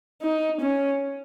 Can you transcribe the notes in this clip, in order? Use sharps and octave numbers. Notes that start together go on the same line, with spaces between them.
D#4
C#4